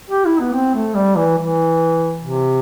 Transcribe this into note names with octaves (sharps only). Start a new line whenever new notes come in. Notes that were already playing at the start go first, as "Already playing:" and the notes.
G4
E4
B3
C4
A3
G3
E3
E3
C3